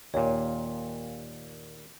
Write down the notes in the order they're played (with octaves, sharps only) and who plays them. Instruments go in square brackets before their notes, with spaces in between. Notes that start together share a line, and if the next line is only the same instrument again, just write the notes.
[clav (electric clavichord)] D#2 A#2 [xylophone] C#5